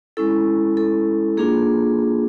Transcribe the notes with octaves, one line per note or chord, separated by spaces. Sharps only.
G#3 C#4 E4 A4
A4
A#3 D4 F4 G#4